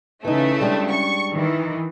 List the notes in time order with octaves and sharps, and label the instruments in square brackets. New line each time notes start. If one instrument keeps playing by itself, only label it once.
[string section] C#3 A3 [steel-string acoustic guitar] E3 D#4
[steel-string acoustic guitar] G3 G#3 D4
[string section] C#6
D#3 E3